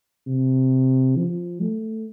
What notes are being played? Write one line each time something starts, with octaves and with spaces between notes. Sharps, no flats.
C3
F3
A3